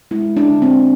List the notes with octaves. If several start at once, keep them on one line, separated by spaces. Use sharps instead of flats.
G#3 E4
D4
D3
C4